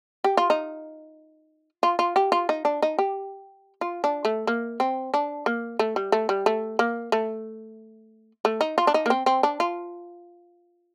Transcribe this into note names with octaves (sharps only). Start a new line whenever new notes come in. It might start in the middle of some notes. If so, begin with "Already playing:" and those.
G4
F4
D#4
F4
F4
G4
F4
D#4
D4
D#4
G4
F4
D4
A3
A#3
C4
D4
A#3
A3
G3
A3
G3
A3
A#3
A3
A3
D#4
F4
D4
D#4
A#3
C4
C4
D4
F4